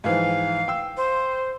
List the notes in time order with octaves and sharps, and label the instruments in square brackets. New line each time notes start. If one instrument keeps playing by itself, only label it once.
[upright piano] G#2 E3 F3 [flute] F5
[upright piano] G5 E6
[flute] C5